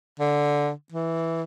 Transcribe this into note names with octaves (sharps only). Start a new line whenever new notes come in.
D3
E3